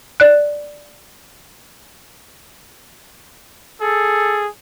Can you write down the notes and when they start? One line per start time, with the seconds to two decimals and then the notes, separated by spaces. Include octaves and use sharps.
0.20 D5 F#6
3.82 G#4 A4